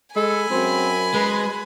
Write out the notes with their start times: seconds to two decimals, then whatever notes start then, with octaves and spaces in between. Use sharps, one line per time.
0.16 G#3 A4 G#5 B5
0.51 F#2 C4
1.14 G#3 B4